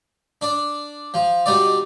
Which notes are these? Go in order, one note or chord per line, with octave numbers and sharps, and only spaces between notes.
D4 D5
F3
B2 G3 D#4 D5